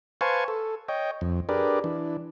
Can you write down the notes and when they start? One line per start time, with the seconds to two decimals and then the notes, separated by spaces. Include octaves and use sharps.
0.21 B4 C5 F5 G#5 A5 C#6
0.48 A4
0.88 C#5 D#5 G5
1.21 F2
1.49 D4 G4 G#4 A#4 B4 D5
1.84 E3 D4